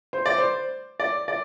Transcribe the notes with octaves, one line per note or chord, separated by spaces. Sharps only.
C5
D5
C5
D5
D5